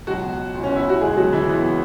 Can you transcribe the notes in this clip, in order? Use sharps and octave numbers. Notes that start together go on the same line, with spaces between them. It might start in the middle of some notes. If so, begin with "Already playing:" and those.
C#2 B2 F#3 F#4
C#2 B2
C#4
E4
F#4
C#2 B2 G#3 G#4
F#3 F#4
E3 E4
C#2 B2 B3